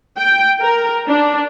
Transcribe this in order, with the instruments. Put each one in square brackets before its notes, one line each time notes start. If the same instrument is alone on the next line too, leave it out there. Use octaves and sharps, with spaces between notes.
[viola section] G5
A#4
D4